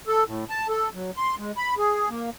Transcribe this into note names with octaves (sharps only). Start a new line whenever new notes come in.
A4
A2
A5
A4
F#3
C6
G#3
B5
G#4
A#3